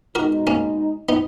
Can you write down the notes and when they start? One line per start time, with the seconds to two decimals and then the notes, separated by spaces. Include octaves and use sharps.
0.15 B2 G#3 D#4 F#4 A#4
0.47 A#3 C#4
1.09 B3 D#4